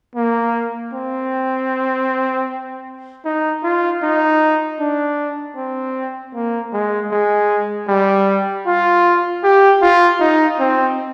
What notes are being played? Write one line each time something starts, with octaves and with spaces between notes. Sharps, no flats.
A#3
C4
D#4
F4
D#4
D4
C4
A#3
G#3
G#3
G3
F4
G4
F4
D#4
C4